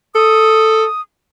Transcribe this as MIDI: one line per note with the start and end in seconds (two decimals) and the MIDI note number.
0.15 0.85 69
0.15 1.01 87